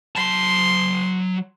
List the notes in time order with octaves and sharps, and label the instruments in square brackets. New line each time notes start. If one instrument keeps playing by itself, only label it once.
[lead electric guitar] F#3 A5 [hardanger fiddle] C6